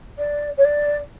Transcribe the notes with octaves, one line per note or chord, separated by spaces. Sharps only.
D5
C#5
D5